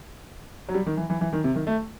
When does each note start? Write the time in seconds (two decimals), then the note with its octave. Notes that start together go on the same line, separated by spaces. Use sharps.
0.69 F#3
0.74 G3
0.86 D#3
0.97 E3
1.10 E3
1.21 E3
1.33 D#3
1.44 C3
1.55 D#3
1.67 A3